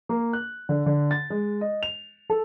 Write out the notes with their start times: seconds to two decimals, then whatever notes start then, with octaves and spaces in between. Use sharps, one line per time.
0.09 A#3
0.33 F#6
0.69 D3
0.86 D3
1.11 A6
1.30 G#3
1.61 D#5
1.83 F7
2.30 A4